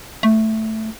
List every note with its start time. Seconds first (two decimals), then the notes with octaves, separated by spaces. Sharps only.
0.23 A3